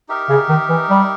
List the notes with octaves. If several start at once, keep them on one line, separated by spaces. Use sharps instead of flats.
D#4 G4 A#4 E5
C#3
D#3
E3
G3